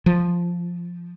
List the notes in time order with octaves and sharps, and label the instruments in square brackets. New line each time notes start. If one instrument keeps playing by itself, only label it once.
[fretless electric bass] F3